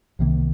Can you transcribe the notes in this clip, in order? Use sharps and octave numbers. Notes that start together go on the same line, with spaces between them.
C2 C3 D#3 A#3